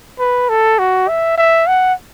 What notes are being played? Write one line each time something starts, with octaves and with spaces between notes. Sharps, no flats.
B4
A4
F#4
E5
E5
F#5